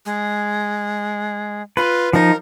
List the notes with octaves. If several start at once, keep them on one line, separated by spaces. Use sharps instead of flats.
G#3
F4 B4
F3 D#4 A#4